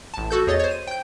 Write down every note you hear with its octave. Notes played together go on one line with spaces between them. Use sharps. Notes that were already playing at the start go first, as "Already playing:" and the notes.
A1 A5
F#4 A4 G6
E2 G#4 C#5 D#5 A6
C5 C#5
D#7
G5 G6